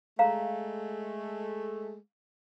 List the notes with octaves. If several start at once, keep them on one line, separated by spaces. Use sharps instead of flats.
G#3 A3 F5 A#5